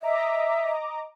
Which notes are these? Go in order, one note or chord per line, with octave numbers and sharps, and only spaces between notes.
D#5 E5 A#5 D6